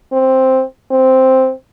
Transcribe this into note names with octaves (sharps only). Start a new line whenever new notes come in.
C4
C4